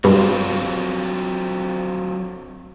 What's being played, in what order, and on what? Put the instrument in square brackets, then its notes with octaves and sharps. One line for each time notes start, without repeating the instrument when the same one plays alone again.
[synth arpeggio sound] G2 B2 [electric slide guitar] F#3 C4 F4